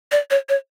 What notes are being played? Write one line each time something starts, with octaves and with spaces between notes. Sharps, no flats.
D5
C#5
C#5